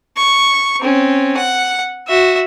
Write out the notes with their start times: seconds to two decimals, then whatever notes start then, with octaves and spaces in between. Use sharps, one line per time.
0.17 C#6
0.81 C4 C#4
1.37 F#5
2.08 F#4 E5